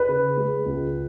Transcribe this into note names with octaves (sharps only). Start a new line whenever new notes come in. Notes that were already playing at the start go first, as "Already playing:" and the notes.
Already playing: B4
C#3
G#3
C#2